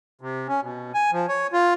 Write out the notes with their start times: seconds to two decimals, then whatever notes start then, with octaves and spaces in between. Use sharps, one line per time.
0.21 C3
0.48 C#4
0.61 B2
0.94 G#5
1.12 F3
1.28 C#5
1.53 F4